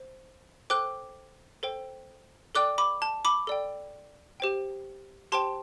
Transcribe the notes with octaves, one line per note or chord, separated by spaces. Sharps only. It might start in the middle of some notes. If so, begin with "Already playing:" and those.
Already playing: C5
A4 C5 G5 D6 F#6
A4 C5 G5
A4 D5 G5 D6 F#6
B5 D6
A5
B5 D6
A4 D5 G5
G4 C5 G5
G4 C5 G5 A5 C6